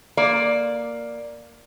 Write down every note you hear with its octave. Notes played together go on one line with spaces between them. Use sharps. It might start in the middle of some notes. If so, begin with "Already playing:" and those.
A#3 D5